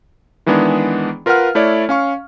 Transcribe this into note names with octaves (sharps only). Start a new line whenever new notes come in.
D#3 E3 G#3 B3 D4 G#4
F4 A#4 B4 F5 F#5 F6
A3 E4 C#5 D5
C#4 F5 C#6